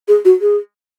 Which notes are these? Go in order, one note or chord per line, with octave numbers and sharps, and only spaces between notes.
G#4
F#4
G#4